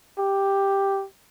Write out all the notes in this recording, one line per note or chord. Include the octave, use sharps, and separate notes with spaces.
G4